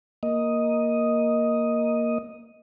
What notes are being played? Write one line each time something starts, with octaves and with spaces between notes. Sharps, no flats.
A#3 D#5